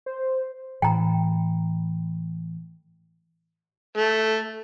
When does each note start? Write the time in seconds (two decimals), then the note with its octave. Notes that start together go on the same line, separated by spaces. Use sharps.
0.06 C5
0.82 A2 E3 G5 A#5 B5
3.98 A3